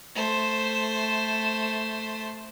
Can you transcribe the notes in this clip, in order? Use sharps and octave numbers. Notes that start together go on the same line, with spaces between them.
A3 C5